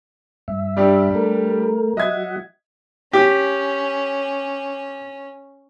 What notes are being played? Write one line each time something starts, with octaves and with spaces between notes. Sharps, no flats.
G2 E5
G3 D4 G4
A3 A#4
F#3 D#5 E5 F#5 G#6
C#4 G4